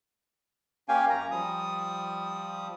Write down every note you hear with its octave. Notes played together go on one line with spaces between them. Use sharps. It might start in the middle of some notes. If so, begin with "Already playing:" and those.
A#3 C#4 G4 F5 G5 G#5
F#2 A#5
F3 G3 D#6